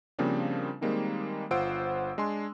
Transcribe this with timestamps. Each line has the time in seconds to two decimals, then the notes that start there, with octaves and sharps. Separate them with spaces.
0.19 C#3 F3 G3 A#3 C4 D4
0.81 D#3 G3 G#3 A#3 C4 D#4
1.51 G1 F4 C5 F#5 E6 D7
2.18 G#3 D4 G#5 C6